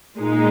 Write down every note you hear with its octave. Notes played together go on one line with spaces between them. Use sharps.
A#2 G#3 D#4